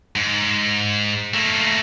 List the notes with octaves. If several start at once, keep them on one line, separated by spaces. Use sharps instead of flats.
G#2
A3 A#3